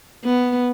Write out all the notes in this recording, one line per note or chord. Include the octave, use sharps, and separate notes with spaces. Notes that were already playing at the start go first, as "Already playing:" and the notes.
B3